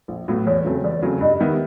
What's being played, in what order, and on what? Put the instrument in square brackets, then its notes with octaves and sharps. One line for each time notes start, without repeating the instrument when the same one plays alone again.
[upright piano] A#1
A2 F#3 B3
[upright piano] E2 [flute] C#5
[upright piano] C#3 F#3 A3 C4
[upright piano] E2 [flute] D5
[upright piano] C#3 F#3 A3 C4
[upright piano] G2 [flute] D#5
[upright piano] D#3 G3 B3 E4